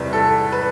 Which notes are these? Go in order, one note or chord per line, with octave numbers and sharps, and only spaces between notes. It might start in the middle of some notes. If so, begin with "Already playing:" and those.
Already playing: E2 C3 G3 B4
A4
B4